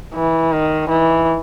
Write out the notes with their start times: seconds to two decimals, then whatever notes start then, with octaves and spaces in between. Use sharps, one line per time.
0.15 E3
0.52 D#3
0.89 E3